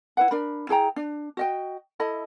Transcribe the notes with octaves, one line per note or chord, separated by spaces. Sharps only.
E4 B4 F#5
D4 A#4 B5
E4 G#4 G5 A#5
D4
F#4 D#5 G5
E4 A4 D#5 B5